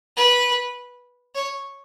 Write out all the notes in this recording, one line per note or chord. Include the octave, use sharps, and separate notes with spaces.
B4
C#5